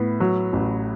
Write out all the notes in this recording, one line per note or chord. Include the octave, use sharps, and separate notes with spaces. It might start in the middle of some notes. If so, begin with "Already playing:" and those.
Already playing: A2 B3
F#3
A1